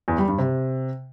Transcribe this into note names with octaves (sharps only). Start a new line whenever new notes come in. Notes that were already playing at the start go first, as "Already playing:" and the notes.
E2
G3
G2
C3